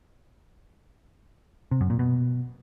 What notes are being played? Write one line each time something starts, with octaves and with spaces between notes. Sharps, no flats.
C3
F#2
A#2
B2